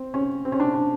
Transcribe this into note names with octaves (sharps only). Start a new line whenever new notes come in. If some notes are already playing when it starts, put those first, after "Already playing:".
Already playing: C4
C#4
C4
C#4
D4
D4